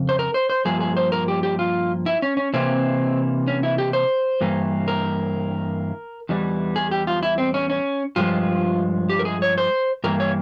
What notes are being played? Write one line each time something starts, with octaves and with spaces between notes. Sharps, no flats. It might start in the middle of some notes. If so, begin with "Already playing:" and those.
Already playing: F2 C#3
C5
A#4
C5
C5
G2 F3 A#3 G#4
G#4
C5
A#4
G4
G4
F4
E4
C#4
C#4
C3 E3 A#3 C4
C#4
E4
G4
C5
G2 E3 A#3
A#4
E2 E3 G3
G#4
G4
F4
E4
C4
C#4
C#4
G2 F3 G#3 F4
G4
A#4
G#4
C#5
C5
G2 E3 A#3 A#4
C#5